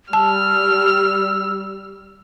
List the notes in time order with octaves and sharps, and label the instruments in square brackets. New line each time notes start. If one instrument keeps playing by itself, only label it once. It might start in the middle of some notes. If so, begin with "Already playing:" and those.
[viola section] G3 [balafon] A5 [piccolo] E6 [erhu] F6